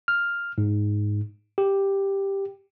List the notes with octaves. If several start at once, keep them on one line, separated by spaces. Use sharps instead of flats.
F6
G#2
G4